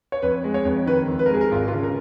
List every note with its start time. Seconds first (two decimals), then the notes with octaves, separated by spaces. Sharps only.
0.12 C#5
0.22 F2 B4
0.44 G#3
0.54 C#5
0.65 F2
0.86 D#3 B4
1.08 F2
1.19 B4
1.26 A#4
1.30 G#3 G#4
1.41 A#4
1.52 G#1 F4
1.68 F4
1.73 C#3
1.83 A#4